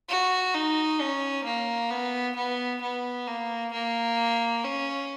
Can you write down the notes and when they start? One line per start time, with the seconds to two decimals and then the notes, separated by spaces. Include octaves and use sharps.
0.09 F#4
0.54 D#4
1.01 C#4
1.45 A#3
1.91 B3
2.36 B3
2.82 B3
3.28 A#3
3.73 A#3
4.64 C#4